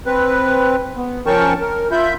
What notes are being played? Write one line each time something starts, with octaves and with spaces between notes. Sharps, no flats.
C4 B4
B3
F3 C#4 A#4 G5 A5 C#6
A#4
F4 E5 B5 G6